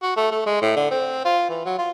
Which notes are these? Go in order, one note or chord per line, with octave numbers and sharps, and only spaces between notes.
F#4
A3
A3
G#3
A2
D3
C4
F4
E3
F#3
F4